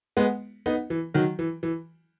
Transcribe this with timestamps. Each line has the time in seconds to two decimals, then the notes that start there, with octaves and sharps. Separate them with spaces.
0.17 G#3 B3
0.66 B3 D#4
0.90 E3
1.14 D#3 F#3
1.39 E3
1.63 E3